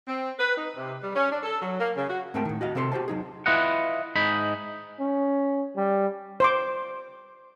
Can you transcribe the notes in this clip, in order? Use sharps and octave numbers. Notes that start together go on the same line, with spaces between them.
C4
B4
D#4
C3
G3
C#4
D4
A4
F#3
A#3
C#3
F#4
G#2 A3 C4 A#4 G5 A5
A2 D#3
F#4 D#5 F5
C3 C4 A4 D#5 C6
F#4 G4 C5 A5
F#3 D#4 G#4
E4 F4 B4 D#5 F#5
G#2 D#4 B5
C#4
G3
C5 C6 D6